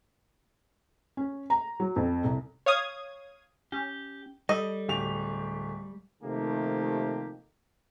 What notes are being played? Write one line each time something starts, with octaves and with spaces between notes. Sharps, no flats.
C#4
A#5
F#3
F2
C2
C#5 F5 D#6 G#6
C#4 G4
G3 A4 D#5
D1 G4 F7
C3 D#3 F3 A3 A#3 G4